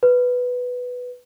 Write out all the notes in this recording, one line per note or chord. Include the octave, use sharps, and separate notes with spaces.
B4